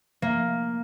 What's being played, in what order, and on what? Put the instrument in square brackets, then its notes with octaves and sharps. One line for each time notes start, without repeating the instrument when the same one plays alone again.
[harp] A#3